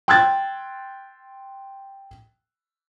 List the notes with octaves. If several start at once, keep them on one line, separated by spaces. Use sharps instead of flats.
G5 C6 E6 F#6 G#6 A6